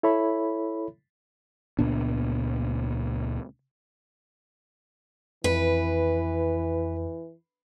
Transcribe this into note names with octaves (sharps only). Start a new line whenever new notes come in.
E4 A4 C#5 E5 B5
C#2 A#2 B3 D4
F2 E3 B4